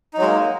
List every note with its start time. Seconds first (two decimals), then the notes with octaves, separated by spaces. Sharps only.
0.14 D#4
0.18 F#3
0.22 G#3
0.26 A#3